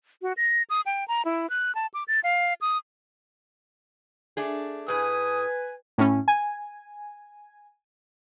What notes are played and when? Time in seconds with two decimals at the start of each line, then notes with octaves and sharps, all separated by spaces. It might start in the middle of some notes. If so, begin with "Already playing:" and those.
0.22 F#4
0.37 A#6
0.70 D#6
0.86 G5
1.08 A#5
1.25 E4
1.50 F#6
1.75 A5
1.94 D6
2.08 A6
2.24 F5
2.61 D#6
4.37 A3 D4 G#4
4.88 A2 G#4 B4 G#5 D#6
5.98 A2 C#4
6.28 G#5